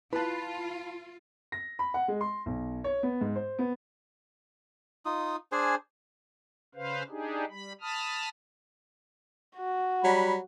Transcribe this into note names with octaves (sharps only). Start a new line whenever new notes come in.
E4 F4 B4 A5 B5
A#6
B5
F#5
G#3
C6
B1
C#5
B3
G#2
C5
B3
D#4 F4 D#6
D4 G#4 C5 G#5
C#3 B4 C5 F5
D4 D#4 G4 G#4
G3 B5
A5 B5 D#6 F6
F#4
F#3 G3 B5